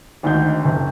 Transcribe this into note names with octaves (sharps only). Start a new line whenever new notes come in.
G#1 D2 D#4 F#5 G6
F#1